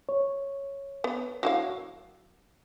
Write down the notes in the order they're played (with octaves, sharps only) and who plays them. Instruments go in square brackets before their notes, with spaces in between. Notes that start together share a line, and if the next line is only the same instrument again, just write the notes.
[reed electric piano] C#5
[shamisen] B3
F#3 E4 F5